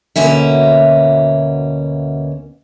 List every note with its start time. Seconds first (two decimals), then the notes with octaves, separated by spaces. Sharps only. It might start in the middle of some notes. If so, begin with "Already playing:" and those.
0.16 D2 B2 A#3 C#4 E5